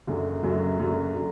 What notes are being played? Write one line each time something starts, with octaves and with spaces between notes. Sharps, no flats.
F#1 F#2 D3 F#3
F#1 F#2 D3 F#3
F#1 F#2 D3 F#3
D3 F#3